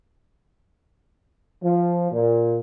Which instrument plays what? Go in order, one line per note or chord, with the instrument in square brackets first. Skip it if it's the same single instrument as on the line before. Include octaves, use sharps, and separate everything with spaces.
[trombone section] F3
A#2